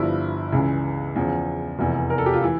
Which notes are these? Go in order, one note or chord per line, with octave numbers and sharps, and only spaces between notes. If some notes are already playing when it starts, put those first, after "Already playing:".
Already playing: G1 G2 F3 E4
C#2 C#3 E3
E2 C#3 F3
F1 E2 E3
A#4
A4
G4
F4
E3 E4